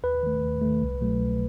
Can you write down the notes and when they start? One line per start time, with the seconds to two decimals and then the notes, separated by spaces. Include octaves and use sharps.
0.03 D#2 B4
0.23 D#3 A3
0.43 D#2
0.61 D#3 A3
0.82 C2
1.01 B2 F#3 A3
1.21 C2